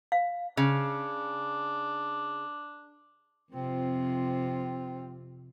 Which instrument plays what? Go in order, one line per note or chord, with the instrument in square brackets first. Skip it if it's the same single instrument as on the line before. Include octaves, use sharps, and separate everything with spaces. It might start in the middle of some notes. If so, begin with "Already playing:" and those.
[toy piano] F5
[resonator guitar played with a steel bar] C#3 [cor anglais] D4
[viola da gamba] F2 C3 F4 [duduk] C4